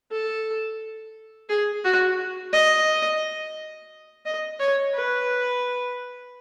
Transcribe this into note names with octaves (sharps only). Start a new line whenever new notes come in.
A4
G#4
F#4
D#5
D#5
C#5
B4